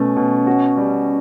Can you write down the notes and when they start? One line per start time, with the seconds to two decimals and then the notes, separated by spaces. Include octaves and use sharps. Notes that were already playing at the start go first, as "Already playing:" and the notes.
Already playing: B2 A3 C#4
0.16 B2
0.47 F#4
0.78 G3